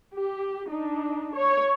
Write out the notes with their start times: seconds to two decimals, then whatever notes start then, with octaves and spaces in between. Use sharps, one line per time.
0.16 G4
0.69 D4 D#4
1.35 C#5